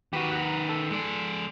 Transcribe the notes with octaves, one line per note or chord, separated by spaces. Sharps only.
D#3 F#4 G4 B4
F#5 A#5
A4
G#3 D5